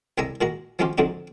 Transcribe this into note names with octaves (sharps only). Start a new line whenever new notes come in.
C2 G3 G#3 E5 G#5 A#5
A#2 G#3 F#4 A#5
F3 F#3 G#3 C#4 F4 G4
F2 D3 F#3 G#3 C4 D#4